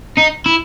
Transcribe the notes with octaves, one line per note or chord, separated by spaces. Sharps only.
D#4
E4